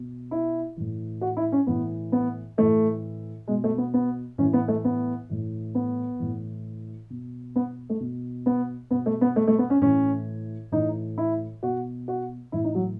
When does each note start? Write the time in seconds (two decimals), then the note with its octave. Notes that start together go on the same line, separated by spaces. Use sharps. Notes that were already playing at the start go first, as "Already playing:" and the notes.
Already playing: B2
0.31 E4
0.76 A2 E3
1.21 F#4
1.37 E4
1.52 C#4
1.67 A2 E3 B3
2.12 B3
2.57 A2 E3 A3
3.48 B2 G#3
3.64 A3
3.78 B3
3.94 B3
4.38 A2 E3 C#4
4.53 B3
4.68 A3
4.84 B3
5.29 A2 E3
5.75 B3
6.19 A2 E3
7.10 B2
7.56 B3
7.90 A3
8.00 B2
8.46 B3
8.91 B2 B3
9.06 A3
9.21 B3
9.36 A3
9.47 A3
9.58 B3
9.70 C#4
9.81 A2 E3 C#4
10.72 A2 E3 D#4
11.18 E4
11.63 B2 F#4
12.08 F#4
12.52 A2 E3 E4
12.64 D#4
12.75 F#3